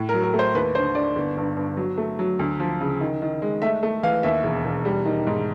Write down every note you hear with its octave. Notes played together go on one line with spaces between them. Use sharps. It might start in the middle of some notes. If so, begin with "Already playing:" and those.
Already playing: A2
A#4
F#3
A#4
A3
C5
D#2 B4
D3 C5
D3 D5
G1
G2
G2
F#3
A3
F#3
D2
F3
C#3
D#3
D#3
G#3
A3 E5
A3
E3 F5
D#2 E5
E1
E1
G3
D#3
G#2